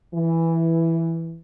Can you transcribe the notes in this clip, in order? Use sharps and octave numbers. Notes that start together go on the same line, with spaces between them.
E3